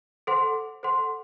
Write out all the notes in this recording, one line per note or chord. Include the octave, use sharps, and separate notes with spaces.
A4 C5 F#5 C6
A4 C5 F#5 C6